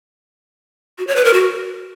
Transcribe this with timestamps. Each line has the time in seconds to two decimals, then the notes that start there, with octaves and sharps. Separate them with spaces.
0.99 F#4
1.07 C#5
1.16 B4
1.25 A#4
1.33 F#4